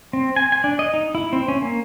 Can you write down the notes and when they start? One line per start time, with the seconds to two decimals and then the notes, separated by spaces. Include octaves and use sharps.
0.13 C4
0.36 G#5
0.52 G#5
0.64 D4
0.79 D#5
0.94 D#4
1.15 E4
1.33 C4
1.48 C#4
1.62 A#3